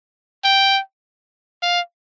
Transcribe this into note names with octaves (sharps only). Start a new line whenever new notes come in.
G5
F5